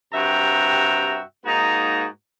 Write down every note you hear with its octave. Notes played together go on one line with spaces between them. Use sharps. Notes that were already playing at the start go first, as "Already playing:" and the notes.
G2 C3 F#4 E5 G5 A#5
G#2 A#3 D#4 F#4 A#5